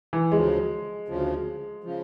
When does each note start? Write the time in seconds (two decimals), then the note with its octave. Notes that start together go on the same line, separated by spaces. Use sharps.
0.13 E3
0.32 D2 C#3 F3 G#3
1.08 D2 C#3 F3
1.84 C#3 F3